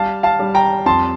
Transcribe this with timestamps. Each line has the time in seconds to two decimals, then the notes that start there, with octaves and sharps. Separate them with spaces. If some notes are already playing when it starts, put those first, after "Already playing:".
Already playing: G3 F5 A5
0.23 F5 A5
0.39 G3
0.55 G5 A#5
0.86 F2 A5 C6